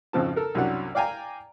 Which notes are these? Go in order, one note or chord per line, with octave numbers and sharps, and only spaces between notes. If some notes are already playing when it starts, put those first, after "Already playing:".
G#1 F2 C#3 F3 A5
A4 A#4
C2 F#2 F#3 D4 F#5
D5 F5 G5 G#5 A#5